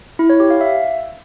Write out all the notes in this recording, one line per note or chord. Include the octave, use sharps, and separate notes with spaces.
E4
C#5
G4
F5
E5